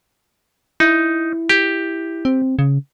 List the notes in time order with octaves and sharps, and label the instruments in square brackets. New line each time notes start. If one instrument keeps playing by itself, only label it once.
[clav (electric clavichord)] D#4 [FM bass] E4
[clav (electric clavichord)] G4
[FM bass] C4
C#3